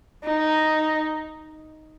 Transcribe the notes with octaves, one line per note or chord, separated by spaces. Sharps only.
D#4